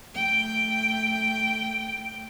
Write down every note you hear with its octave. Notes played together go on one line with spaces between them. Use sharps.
A3 G5